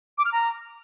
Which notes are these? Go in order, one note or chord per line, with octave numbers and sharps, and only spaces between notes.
D6
F6
A#5